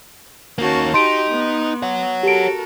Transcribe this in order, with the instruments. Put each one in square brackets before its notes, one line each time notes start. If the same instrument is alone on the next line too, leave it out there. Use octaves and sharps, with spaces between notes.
[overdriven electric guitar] D#3 A#3 [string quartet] C#4 F#4 A5
[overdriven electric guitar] D#4 [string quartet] F#4 G4 [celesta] C6 D7
[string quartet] B3
[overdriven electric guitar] C#5 F#5
[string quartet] F#4 A4 A#4 [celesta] G4 D7